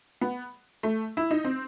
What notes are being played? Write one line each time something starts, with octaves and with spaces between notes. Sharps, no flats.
B3
A3
E4
D#4
C4